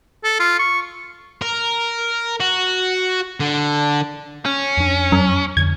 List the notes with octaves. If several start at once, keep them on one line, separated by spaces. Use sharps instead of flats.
A4
F4
C#6
A#4
F#4
D3
C#4
F2 D4
F#2
F2 D3 G#6